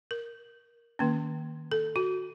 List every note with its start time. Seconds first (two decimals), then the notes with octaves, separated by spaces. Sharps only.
0.11 A#4
0.99 D#3 A#3 C#4
1.72 A4
1.96 F#4